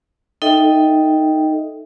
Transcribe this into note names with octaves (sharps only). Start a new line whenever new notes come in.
D#4 A4 D#5 E5 G5